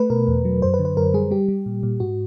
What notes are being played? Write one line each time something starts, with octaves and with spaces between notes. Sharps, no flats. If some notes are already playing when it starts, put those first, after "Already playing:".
Already playing: A3 B4
B2 A#4
E2
F#3
F#2 C5
B4
D3
B4
F#2 A#4
G3 G#4
G3 G4
G3
A#2
A#2
G#2 F#4